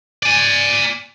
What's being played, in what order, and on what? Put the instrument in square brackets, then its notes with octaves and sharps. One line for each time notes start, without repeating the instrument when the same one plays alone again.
[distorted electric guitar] D5 G#5